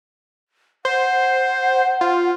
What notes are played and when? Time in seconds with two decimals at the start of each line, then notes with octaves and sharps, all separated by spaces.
0.85 C5 F#5
2.01 F4